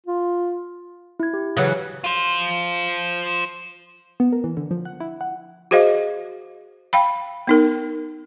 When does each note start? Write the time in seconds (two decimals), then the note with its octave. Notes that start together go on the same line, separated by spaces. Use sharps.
0.06 F4
1.20 E4 G#6
1.34 G4
1.57 C#3 E3 F#3
2.04 F4 C5
4.20 B3
4.32 A#4
4.44 E3
4.57 D3
4.71 F3
4.85 F#5
5.00 E4
5.21 F#5
5.71 F#4 G#4 C5 D#5 F5
6.93 F5 G5 B5
7.47 B3 D#4 A#4